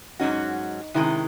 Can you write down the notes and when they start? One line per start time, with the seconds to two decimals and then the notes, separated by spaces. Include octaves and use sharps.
0.20 G#2 F#3 C#4 D#4 F#4
0.94 C3 D#3 G#3 C#4 E4